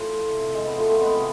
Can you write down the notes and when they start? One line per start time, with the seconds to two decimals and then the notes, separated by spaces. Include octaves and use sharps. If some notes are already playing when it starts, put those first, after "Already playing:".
Already playing: A2 F3
0.31 C3
0.54 G#3
0.67 B3
0.78 F3 A3
0.88 A3 C4
1.01 G#3 B3
1.12 C3